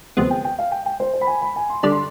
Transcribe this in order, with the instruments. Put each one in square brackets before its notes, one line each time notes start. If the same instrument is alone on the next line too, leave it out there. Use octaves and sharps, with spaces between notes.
[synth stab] D2 C3 F3 G#3 B3 [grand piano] C5
[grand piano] G5
G5
F5
G5
G5
C5
C5
B5
G#5
B5
G#5
C6
[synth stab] D3 G3 D4 [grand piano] D6
[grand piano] C6